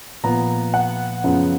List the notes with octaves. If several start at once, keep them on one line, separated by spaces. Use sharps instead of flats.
A#2 F3 B3 A#5
F#5
F#2 C#3 F3 B3